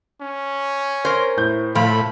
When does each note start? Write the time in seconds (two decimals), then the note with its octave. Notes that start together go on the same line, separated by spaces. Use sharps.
0.22 C#4
1.05 A#4 C5 C#5
1.37 A2 G6
1.75 A2 F3 F5 B5